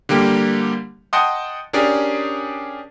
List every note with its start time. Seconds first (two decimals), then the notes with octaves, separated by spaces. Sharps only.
0.09 D3 G3 A#3 G4
1.13 D#5 F#5 G5 A5 C6 D#6
1.73 C#4 D4 G4 G#4 A#4 D5